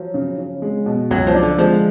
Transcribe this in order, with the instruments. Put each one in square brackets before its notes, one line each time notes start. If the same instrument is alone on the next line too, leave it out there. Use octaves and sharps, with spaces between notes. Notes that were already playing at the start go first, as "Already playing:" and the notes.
Already playing: [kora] F3 [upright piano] F#3
[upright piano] C#3
C#3
G#3
B2
[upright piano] C#2 [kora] F#3
[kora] F3
[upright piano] D4
[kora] D3
[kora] F3 [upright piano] G#3